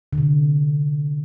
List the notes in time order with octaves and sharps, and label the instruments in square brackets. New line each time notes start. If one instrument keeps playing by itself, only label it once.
[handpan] D3
C3